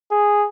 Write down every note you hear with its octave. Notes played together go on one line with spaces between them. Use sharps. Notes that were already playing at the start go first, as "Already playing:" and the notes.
G#4